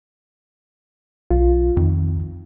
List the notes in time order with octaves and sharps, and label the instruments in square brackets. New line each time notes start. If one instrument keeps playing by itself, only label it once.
[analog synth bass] B1 [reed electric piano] F4
[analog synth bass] F2 [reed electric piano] D#3